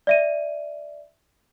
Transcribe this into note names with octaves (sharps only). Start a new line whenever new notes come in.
D5 E5 D#7